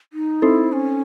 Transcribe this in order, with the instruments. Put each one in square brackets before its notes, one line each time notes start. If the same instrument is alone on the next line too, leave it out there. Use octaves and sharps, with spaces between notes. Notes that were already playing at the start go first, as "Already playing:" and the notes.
[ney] D#4
[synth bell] C4 D#4 A4 C5 [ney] E4
[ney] C#4